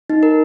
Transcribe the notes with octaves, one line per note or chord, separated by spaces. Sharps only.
D#4
A#4